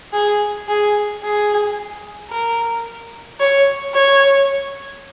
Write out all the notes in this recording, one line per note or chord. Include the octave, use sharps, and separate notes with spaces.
G#4
G#4
G#4
A#4
C#5
C#5